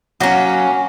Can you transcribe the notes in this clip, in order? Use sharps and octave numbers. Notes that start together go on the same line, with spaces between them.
F#3 A#3 C#4